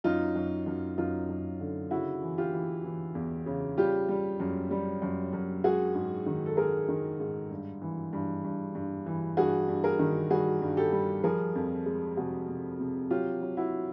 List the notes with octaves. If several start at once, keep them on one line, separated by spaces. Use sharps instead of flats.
F#2 D#4 F4
F#2
F#2
F#2 D#4 F4
F#2
D3
C#3 E4 F#4
E3
F4 G4
E3
E3
E2
C#3
G3 F4 G4
G3
F#2
G3
F#2
F#2
G#3 F#4 G#4
G#2
D#3
A4
G#3 G#4 A#4
D#3
G#2
G2
E3
G2
G2
G2
E3
G2 F#4 G#4
G2
G#4 A#4
D#3
G3 F#4 G#4
G2
G4 A4
G3
F3 G#4 A#4
F2
G#3
C3 F#4 G#4
C3
C3
F#3 F4 G4
F#3
E4 F#4